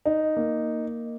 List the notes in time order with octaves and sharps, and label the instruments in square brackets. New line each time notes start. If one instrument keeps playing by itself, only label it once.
[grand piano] D#4
A#3